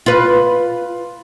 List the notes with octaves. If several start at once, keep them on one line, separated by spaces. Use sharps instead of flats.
F4 B4